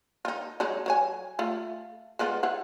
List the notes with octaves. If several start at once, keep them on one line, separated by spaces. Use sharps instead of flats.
D#4 F4
F#3 G#3 D#4
F#3 C#5 G#5
A3 F4
G#3 B3 F4
E4 C5 F#5